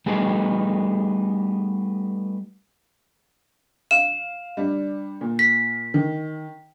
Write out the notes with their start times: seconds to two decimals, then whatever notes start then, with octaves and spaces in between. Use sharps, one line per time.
0.06 G3 A3 B3 D#4 G4 G#4
3.91 F5 E7
4.57 G3 D4
5.21 A#2
5.39 B6
5.94 D#3